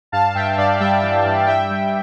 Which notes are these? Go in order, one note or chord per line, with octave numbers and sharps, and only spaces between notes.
G2 F5 A5
G2 E5 G5
G2 D5 F5
G3 E5 G5
E3
G2
G3 E5 G5
G3